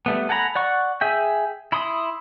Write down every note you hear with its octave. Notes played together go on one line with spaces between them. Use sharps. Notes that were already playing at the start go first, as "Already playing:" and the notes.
G3 A3 B3
A4 F#5 G#5 A#5 B5
D5 F#5 C#6
G#4 E5 G5
E4 B5 C6 D#6